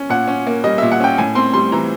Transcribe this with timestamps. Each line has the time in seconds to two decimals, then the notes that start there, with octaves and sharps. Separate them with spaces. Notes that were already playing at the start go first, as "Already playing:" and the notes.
Already playing: C#4
0.10 A#2 F#5
0.28 C#4
0.47 A#3
0.64 G3 D#5
0.78 A#2 E5
0.92 F#5
1.00 C#4 G5
1.18 A2 G#5
1.35 C4 C6
1.53 G3 C6
1.72 E3 A#5